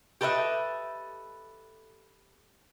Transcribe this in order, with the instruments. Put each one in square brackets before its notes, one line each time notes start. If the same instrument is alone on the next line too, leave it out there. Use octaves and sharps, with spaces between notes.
[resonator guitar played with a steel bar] G4 A4 B4 D#5 E5